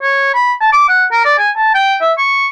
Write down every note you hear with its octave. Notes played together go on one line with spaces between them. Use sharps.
C#5
B5
A5
D6
F#5
A#4
D5
G#5
A5
G5
E5
C#6